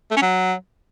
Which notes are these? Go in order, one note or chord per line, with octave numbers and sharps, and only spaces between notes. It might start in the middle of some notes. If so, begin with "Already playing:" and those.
A3
C#4
F#3